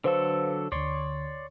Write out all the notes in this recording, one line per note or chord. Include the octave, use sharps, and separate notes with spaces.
D3 F#3 A4 B4 C5 F5
D2 D3 C#5 D5 C6